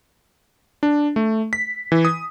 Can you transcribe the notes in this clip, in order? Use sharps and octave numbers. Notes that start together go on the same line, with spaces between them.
D4
A3
B6
E3
D#6